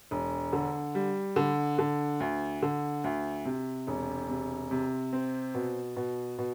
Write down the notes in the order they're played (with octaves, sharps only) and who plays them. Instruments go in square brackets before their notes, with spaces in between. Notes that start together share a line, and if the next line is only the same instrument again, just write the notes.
[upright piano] E1
D3
G3
D3
D3
D2
D3
D2
C3
E1
C3
C3
C4
B2
B2
B2